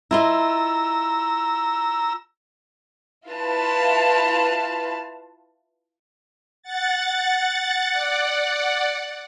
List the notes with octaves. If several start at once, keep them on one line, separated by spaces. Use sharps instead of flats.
E4 F4 D#5 A#5 E6
E4 F4 B4 F5 A5
F#5 A6
D5 F#5